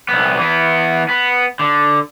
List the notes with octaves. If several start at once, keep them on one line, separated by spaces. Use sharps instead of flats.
C2 B3
E3 B3
B3
D3